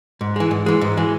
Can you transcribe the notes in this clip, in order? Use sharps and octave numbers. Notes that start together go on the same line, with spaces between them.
G#2
E3 G#3
G#2
E3 G#3
G#2
E3 G#3